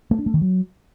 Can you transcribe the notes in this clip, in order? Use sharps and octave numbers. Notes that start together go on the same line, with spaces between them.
A3
D4
A3
D#3
F#3